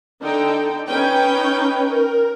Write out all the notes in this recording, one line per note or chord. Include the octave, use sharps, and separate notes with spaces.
D3 D#4 A4 G5
C#4 D#4 B4 C#5 G5
A#4